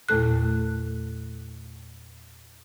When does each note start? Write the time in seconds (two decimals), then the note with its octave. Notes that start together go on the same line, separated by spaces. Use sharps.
0.09 E2 A#2 A3 A4 F#6